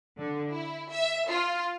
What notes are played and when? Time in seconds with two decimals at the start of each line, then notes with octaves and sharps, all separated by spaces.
0.18 D3
0.51 E4
0.91 E5
1.29 F4